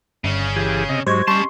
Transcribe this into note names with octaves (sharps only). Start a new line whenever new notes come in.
G1 C#3 C#4
E3 G4 G#4
C3 D#5
G#2 F#3 G4 C5 D#5 C#6 G#6
G3 C#4 A5 C6 C#6